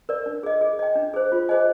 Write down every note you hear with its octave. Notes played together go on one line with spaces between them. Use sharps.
A#4 D5
D4
G#4 D#5
G#4
D#5 G5
D4
G#4 C5
F4
G#4 C5 D#5 G#5